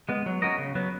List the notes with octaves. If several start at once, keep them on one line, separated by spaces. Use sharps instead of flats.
G#3 B3
F#3
C#4 F#4 A#4 D#5
C#3
F#3 B3